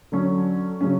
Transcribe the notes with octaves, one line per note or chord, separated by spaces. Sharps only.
D3 F#3 C#4
C#3 F#3 C#4